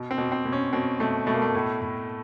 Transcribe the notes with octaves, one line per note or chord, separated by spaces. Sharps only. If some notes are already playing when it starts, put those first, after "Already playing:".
Already playing: B2
C4
B2
C4
B2
C#4
B2 C4
B2 A3
B2 A3
A#3
A3
A2
A2